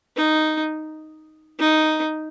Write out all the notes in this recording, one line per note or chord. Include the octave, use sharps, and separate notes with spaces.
D#4
D#4